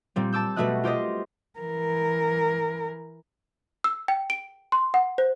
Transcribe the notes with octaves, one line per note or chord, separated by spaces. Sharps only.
A#2 G3 C4
A5 D6 E6 G6
B2 G3 A3 F#4 D#5 F#6
F4 G4 C5 D#5
E3 A#4
E6
G5
D7
C6
F#5
C5